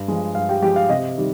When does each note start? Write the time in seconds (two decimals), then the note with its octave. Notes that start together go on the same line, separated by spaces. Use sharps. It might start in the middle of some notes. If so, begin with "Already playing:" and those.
Already playing: G2
0.08 F3 G#3
0.35 G2 F5
0.49 G4 G5
0.62 F3 G#3 G4 G5
0.76 F5
0.89 C3 D#5
1.17 D#3 G3